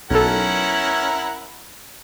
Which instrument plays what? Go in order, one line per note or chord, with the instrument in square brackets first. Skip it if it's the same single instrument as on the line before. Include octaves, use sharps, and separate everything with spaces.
[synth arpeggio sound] B1 A4 [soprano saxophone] C#4 [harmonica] E4 A#4 F#5